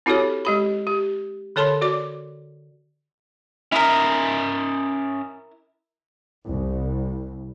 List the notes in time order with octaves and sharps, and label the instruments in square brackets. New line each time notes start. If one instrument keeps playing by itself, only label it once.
[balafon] C4 E4 F#4 G4 A4 C#5
G#3 G4 B5
G4
D3 A4 C#5 A5 B5 C6
F#4 D5 D6
[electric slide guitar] C#4 D#5 E5 [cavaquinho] E4 A#4
[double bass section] C2